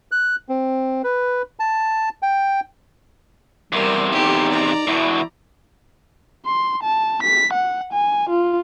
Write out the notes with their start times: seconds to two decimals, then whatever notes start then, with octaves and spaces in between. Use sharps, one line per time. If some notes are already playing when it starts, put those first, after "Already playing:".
0.12 F#6
0.49 C4
1.04 B4
1.60 A5
2.22 G5
3.73 E2 C3 G3 A#4
4.12 D#4 G4 A4
4.49 D5 A#5
4.87 E2 B2 E4
6.46 C6
6.83 A5
7.23 B6
7.53 F#5
7.93 G#5
8.29 F4